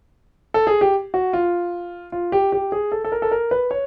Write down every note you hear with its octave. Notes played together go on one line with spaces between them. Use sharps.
A4
G#4
G4
F#4
F4
F4
G4
G4
G#4
A4
A4
A#4
A4
A#4
B4
C#5